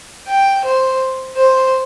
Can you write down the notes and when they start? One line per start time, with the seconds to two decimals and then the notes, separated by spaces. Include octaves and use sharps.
0.28 G5
0.65 C5
1.37 C5